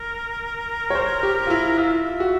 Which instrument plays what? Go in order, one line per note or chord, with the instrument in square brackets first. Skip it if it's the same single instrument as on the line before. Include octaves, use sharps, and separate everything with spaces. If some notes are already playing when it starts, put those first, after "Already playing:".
Already playing: [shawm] A#4
[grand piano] C#5
C5
G4
F4
E4
[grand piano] F4 [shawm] E5
[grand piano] F#4